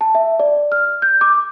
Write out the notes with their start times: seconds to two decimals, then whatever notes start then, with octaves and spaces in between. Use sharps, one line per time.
0.01 A5
0.15 E5
0.40 D5
0.72 F6
1.02 G6
1.21 D6